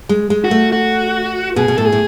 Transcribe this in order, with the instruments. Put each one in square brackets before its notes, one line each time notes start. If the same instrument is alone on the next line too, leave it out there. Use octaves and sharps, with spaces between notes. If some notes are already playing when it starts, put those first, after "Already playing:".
[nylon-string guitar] G#3
G#3
[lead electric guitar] F#4
[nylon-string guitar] A3
[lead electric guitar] F#4
[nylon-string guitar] B2 [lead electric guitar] G#4
[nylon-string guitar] B2
[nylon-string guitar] A2 [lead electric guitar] A4
[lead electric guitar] G#4
[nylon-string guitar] A2